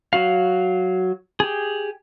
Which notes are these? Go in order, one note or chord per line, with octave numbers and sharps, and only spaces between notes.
F#3 F#4 F5
G4 G#4